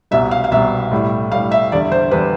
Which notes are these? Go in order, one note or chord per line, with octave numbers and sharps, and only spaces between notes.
C2 B2 G3 E5
F5
F5
C2 B2 G3 E5
A2 G3
A2 G3 F5
E5
E2 D3 G3 D5
C5
E2 D3 G3 B4